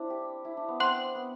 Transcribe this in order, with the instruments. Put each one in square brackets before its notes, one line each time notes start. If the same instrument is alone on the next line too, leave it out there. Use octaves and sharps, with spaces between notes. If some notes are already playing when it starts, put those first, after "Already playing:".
Already playing: [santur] C4 D4 E4
G4
E4
D4
B3
[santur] C4 [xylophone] F#5 C6 F#6
[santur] B3